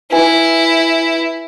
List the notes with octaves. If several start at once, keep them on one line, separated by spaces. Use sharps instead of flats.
E4 B4 G#5